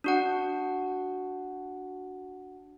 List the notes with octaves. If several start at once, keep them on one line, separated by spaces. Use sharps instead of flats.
D4 F#4 F#5